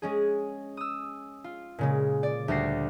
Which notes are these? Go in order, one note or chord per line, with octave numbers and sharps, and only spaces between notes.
G#3 C#4 G#4
D#6 E6
F4
A#2 C#3 G#3
D5
D2 G3 F#4 A#6 C7